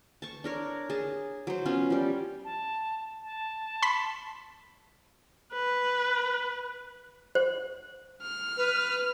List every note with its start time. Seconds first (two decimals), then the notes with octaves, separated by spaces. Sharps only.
0.22 A5 C#6
0.44 D4 A#4 C#5
0.90 G#4 A5
1.47 F#3 C5
1.65 B3 C#4 F4
1.90 F3 G3
2.44 A5
3.25 A5
3.82 B5 C6 B6
5.53 B4
7.35 C5
8.22 F6
8.57 B4